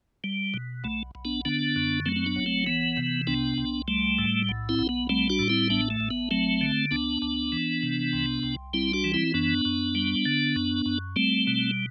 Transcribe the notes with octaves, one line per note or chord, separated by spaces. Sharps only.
G3
B2
B1 A3
B1
B3 D4
D3 B3 D4
F#2
F#3 A3 C4
C4
B3 D4
F#1
A3 C4
E3 B3
C3
C2 B3 D4
C2
G3 A3
A2
B1
C4 E4
B1
B3
G3 A3 C4
D4 F#4
A2
C4 E4
A1 B3 D4
A3
A1
B3
F#3 A3 C4
D3
D2 B3 D4
D2
E3
C3
C2
C2
G3 C4 E4
D4 F#4
E3
C4 E4
F#2 B3 D4
F#2
G3
D3
F#2
F#2
G3 A3 C4
B2